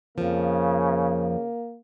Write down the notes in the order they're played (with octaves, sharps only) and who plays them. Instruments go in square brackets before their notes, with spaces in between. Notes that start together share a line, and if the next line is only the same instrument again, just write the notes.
[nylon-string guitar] F2 F3 [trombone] C#3 [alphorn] A#3